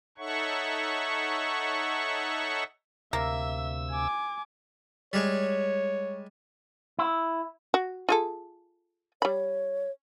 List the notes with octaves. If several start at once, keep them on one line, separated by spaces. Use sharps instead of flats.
D#4 A4 C#5 E5 F#5 C#6
D2 C3 A#3 E5 E6
G#5 D6
G3 G#3 C#5
E4
F#4
F4 G#4 A4
G3 C#5 B5